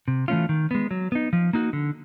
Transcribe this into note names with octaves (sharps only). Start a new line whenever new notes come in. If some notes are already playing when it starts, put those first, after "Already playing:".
C3
E3 A3 C#4 F4
D#3
G#3 B3
F#3
B3 D#4
F3
A#3 D#4 F#4
D3